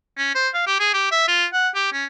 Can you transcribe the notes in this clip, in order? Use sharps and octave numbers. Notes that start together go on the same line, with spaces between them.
C#4
C5
F5
G4
G#4
G4
E5
F4
F#5
G4
C#4